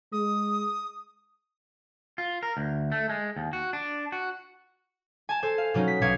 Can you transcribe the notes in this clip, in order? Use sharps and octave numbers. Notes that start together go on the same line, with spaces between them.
G#3 D#6
F4
A#4
D2
A3
G#3
D#2
F#4
D4
F#4
G#5 A5
A4 C5 G#5
F5
B2 F#3 C#4 D#4
B6
B1 B2 F#3 F5 G#6 C#7